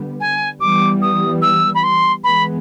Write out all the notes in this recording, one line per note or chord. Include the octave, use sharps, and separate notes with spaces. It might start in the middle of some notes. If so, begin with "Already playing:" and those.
Already playing: D3 G3 B3
G#5
E3 G3 B3 D6
D#6
E6
B5
C6
E3 G#3 B3 B5